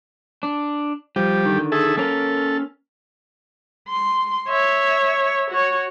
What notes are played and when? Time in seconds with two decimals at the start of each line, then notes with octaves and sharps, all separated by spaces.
0.43 D4
1.16 F3 G3 G4
1.45 D3 D#3
1.72 G#4 A4 E5
1.97 A#3 C#4 A4 A#4
3.89 C6
4.48 C#5 E5
5.50 F#4 C#5